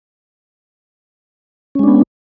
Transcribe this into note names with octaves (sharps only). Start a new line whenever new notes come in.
G#3 B3 C#4 D4